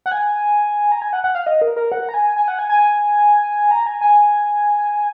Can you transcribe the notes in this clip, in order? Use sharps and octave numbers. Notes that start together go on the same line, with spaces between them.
F#5
G#5
A#5
G#5
F#5
F#5
F5
D#5
A#4
A#4
F#5
A#5
G#5
G#5
F#5
G#5
G#5
A#5
G#5
G#5